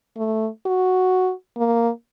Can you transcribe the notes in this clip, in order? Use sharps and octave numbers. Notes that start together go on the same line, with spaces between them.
A3
F#4
A#3